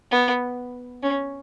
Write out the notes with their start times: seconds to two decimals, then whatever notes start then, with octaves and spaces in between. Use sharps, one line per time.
0.11 B3
1.03 C#4